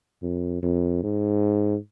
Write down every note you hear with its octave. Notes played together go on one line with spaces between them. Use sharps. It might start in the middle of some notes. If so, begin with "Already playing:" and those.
F2
F2
G#2